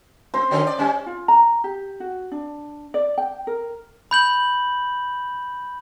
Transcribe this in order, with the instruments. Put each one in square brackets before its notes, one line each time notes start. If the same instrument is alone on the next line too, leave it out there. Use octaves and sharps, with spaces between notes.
[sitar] C4 [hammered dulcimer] C5
[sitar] D3 F#3 C#4
D5
G3 C#4
[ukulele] F4
A#5
G4
F#4
D4
D5
G5
A#4
[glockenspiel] B5 G6 F#7